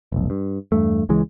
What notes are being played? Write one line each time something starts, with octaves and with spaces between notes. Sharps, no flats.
F1 B1
G2
E2 G2 A3
C#2 E3 G#3